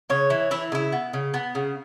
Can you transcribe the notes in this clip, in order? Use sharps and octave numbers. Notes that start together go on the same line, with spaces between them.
C#3 C#5
E3
E3 E4
C#3 E4
B3
C#3
B3
C#3